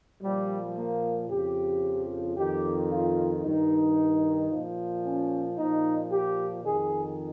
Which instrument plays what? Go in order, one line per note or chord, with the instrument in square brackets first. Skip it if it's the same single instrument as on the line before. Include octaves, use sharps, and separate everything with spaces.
[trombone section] A#2 F3 G3
A#3
F2 C#3 F3 G4
F2 D#3 G4
F4
G2 D#3 D#4
A#2 F3
C#4
A#2 F3 D#4
G4
F2 D#3 G#4